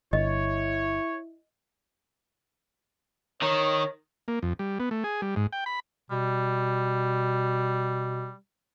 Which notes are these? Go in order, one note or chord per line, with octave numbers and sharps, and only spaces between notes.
G1 E4 C#5 D#5
D#3 C#5
A#3
F2
G3
B3
A3
G#4
G3
G#2
G5
B5
B2 G3